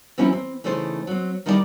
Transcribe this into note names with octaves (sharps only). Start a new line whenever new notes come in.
E3 F#3 C4 C#4 D#4 E4
C4
C#3 E3 A3 D#4 C5
F#3 C4
D#3 G3 D#4 E4 A#4 D5